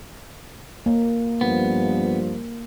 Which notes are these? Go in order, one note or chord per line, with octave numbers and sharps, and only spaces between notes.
A#3
G2 F3 B3